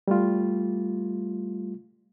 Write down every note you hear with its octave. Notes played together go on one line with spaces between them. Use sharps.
G3 A3 F4